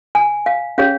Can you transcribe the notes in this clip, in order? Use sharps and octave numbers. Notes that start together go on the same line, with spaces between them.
G#5
F5
C#4 G#4 C#5 F5